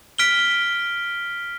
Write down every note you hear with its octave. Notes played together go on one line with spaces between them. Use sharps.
F6 B6 D7 G7